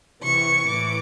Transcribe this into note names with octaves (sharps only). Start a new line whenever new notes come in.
C3 E3 C#6
A2 E3 D6